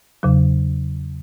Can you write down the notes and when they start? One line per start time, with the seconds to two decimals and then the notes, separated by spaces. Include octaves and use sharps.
0.23 E2 C#3 F#3